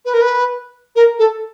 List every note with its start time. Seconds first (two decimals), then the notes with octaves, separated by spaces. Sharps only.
0.05 B4
0.14 A#4
0.22 B4
0.96 A#4
1.19 A4